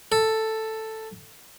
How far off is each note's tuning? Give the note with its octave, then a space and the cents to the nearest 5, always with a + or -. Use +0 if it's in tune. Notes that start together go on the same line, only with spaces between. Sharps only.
A4 +5